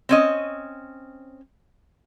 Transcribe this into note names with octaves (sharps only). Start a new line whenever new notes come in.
C4 C#4 D#5